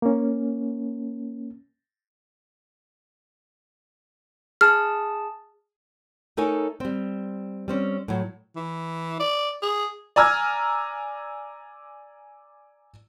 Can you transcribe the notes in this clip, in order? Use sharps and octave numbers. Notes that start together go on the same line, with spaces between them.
A#3 C#4
G#4 A5 F6
A3 D#4 A4 A#4 C#5 G#5
G3 C4
G3 C4 C#4
A2 F#3
E3
D5
G#4
D5 G#5 A#5 E6 F6 G#6